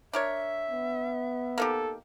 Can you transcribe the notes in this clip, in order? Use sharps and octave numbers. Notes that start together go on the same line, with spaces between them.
D4 A#4 C#5 E5
B3
A#3 D#4 G4 A4